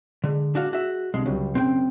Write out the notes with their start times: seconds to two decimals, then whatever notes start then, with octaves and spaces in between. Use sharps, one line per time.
0.24 D3 G#3
0.55 D4 F#4 F5
0.73 F#4 E5
1.14 C2 D3 G#3
1.26 C#2 F#3 G3
1.55 F#1 F#2 C4 G5